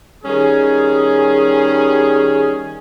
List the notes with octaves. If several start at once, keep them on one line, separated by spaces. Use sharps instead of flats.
D#3 G3 C#4 G#4